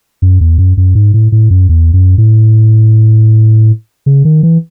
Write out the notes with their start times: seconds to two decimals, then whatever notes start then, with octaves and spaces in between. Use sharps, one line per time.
0.22 F#2
0.41 E2
0.58 F#2
0.77 F#2
0.95 G#2
1.14 A2
1.32 A2
1.50 F#2
1.69 E2
1.93 F#2
2.18 A2
4.06 C#3
4.25 D#3
4.43 E3